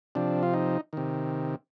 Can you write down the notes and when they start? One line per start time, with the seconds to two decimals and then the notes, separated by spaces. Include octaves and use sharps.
0.15 C3 F3 D4
0.43 F4
0.54 D#4
0.93 C3 D#3